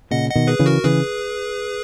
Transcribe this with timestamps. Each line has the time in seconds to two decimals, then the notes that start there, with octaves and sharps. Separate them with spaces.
0.11 A#2 C#3 D#5 F#5
0.30 D#5 F#5
0.35 B2 D#3
0.47 G#4 B4
0.59 C#3 E3
0.66 F#4 A#4
0.84 C#3 E3 G#4 B4